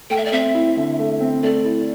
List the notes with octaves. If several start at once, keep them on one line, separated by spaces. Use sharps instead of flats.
A3 G5
E5
D5
C4 E5
E4
D3
A3
C4
A3 D5
E4